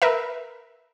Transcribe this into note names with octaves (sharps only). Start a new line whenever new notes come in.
A#4 B4 E5